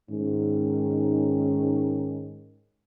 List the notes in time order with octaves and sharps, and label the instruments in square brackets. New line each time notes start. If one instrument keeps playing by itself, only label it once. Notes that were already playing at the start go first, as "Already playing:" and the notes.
[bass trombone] G#2 [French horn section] D#3 C#4